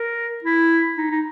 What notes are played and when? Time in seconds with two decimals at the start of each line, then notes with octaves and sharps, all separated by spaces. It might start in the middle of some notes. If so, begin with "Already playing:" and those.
Already playing: A#4
0.44 E4
0.97 D#4
1.11 D#4